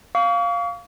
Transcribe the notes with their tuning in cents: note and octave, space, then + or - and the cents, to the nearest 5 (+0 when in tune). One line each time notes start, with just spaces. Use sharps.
F5 +0 C#6 +45